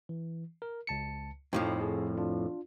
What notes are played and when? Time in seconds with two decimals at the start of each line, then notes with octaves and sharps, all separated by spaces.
0.09 E3
0.62 A#4
0.87 C#2 A5 C#7
1.53 F2 A2 F3 C4 D#4 C5
1.81 G#4
2.18 D4 F4